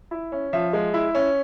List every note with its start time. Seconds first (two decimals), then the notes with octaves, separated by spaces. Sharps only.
0.11 E4
0.32 C#4
0.53 F3 E5
0.73 G#3
0.94 E4
1.15 C#4